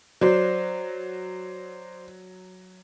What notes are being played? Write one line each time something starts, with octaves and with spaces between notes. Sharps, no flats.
F#3 C5 D5